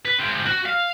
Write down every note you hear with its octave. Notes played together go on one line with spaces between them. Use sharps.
B4
G#3 C4
F#4
F5